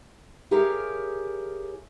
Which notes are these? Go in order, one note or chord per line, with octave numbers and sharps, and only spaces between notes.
E4 G4 G#4 A#4 C#5 F5